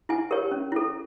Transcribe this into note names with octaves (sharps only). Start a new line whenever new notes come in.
E4 G#5
G4 A#4 C#5
C#4
E4 A4